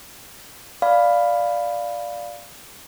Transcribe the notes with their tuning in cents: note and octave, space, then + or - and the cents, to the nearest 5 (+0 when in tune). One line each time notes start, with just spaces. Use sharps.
D5 +0 F5 +0 B5 +0